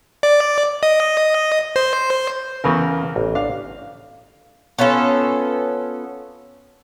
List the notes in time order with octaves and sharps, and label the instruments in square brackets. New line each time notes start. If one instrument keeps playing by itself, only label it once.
[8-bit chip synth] D5
D#5
C5
[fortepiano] E2 A#4 [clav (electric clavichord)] C#3
[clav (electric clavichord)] A1
[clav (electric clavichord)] D4 [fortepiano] F5
[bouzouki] B3 C#4 F4 A4